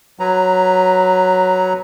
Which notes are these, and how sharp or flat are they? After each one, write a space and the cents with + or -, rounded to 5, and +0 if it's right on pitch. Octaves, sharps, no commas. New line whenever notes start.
F#3 +0 B4 +0 A#5 +0